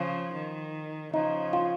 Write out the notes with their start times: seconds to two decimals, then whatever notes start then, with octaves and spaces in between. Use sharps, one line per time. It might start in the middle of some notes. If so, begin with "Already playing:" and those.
Already playing: C#3 F3
0.33 D#3
1.13 C#3 F3 D#4
1.53 F4